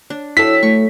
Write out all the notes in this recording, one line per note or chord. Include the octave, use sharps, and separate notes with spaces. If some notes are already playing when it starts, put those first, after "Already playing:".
D4
F#3 E4 A4 F5 G5 E6 B6
A3 C#6